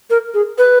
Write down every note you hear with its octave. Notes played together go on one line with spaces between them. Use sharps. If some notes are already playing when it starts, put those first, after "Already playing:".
A#4
G#4
B4